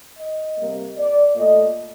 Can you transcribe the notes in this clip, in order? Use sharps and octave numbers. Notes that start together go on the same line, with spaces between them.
D#5
C3 G3 A#3
D5
A#2 A3 D#5